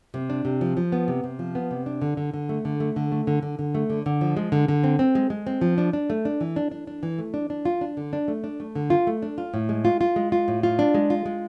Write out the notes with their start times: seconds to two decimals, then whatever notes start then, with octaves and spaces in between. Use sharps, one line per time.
0.14 C3
0.30 D4
0.45 C3
0.61 F3
0.77 F3
0.92 B3
1.08 C3
1.24 C3
1.39 F3
1.55 B3
1.71 C3
1.86 D4
2.02 D3
2.17 D3
2.34 D3
2.49 A3
2.65 D3
2.80 A3
2.96 D3
3.12 A3
3.27 D3
3.43 D3
3.59 D3
3.75 A3
3.90 D3
4.06 D3
4.21 F3
4.37 G#3
4.52 D3
4.68 D3
4.84 C4
4.99 C4
5.15 G#3
5.30 G#3
5.47 C4
5.61 F3
5.78 D4
5.93 D4
6.10 A3
6.25 D4
6.41 E3
6.56 D4
6.72 D4
6.87 D4
7.03 E3
7.19 A3
7.34 D4
7.50 D4
7.65 F4
7.81 D4
7.97 D3
8.13 D4
8.28 A3
8.44 D4
8.60 A3
8.75 D3
8.90 F4
9.07 A3
9.22 D4
9.38 F4
9.54 A2
9.69 G#3
9.85 F4
10.01 F4
10.16 G#3
10.32 F4
10.48 A2
10.63 F4
10.79 D4
10.94 G#3
11.10 F4
11.26 G#3